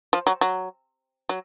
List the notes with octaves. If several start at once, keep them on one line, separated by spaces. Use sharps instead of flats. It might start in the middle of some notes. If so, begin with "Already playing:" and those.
F3
F#3
F#3
F#3